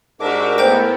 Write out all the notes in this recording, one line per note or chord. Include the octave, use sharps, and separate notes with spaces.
G#2 D4 F#4 G4 A#4 E5 D6
A3 B3 E4 C5 G5 G6